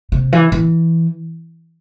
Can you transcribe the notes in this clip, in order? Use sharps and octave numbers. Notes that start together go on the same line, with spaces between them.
C3
E3
E3